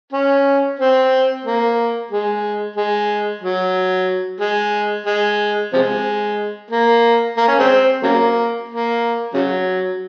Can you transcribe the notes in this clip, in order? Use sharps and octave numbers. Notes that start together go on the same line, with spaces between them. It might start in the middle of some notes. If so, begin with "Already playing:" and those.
C#4
C4
A#3
G#3
G#3
F#3
G#3
G#3
C3 F3 G#3
A#3
A#3
C#4
G#3 C4
C#3 F#3 A#3
A#3
C#3 F#3